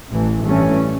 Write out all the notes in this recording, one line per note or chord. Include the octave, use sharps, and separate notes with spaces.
A1 A2 E3
A1 G2 E3 A3 C#4